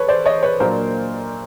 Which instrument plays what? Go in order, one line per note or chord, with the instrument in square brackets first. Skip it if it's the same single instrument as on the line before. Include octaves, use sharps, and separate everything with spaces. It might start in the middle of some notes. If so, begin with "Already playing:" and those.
Already playing: [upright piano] A4 B4 C#5
C5 D5
C#5 D#5
B4 C#5
A#2 F#3 A#3 D4 A#4 C5